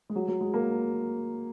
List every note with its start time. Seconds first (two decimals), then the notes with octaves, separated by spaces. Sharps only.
0.10 G#3
0.16 F#3
0.28 F#3
0.41 G#3
0.54 A#3